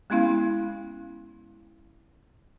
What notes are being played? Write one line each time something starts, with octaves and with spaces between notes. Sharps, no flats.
G#3 B3 C#4 E4 F5